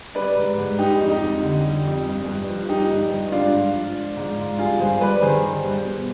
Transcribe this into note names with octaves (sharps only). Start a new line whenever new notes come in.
G3 B4 D5
G#2
G#2
G3 D#4 G4
F2
D#4 G4
F2
D3
G3
F2
G2
G2
F3
F3 D#4 G4
G2
G2
G#2 D4 F4
G#2
F3
F3
G#2
G#2
G3 F4 G#4
G2 G#4 C5
G2 B4 D5
D#3 G#4 C5
G3
G2
B2